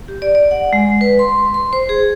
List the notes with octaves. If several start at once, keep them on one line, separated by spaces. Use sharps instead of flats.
G4
D5
D5
F#5
G#3
B4
C6
C6
C5
G#4